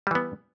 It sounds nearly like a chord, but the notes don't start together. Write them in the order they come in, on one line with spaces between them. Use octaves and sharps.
G3 E3 B3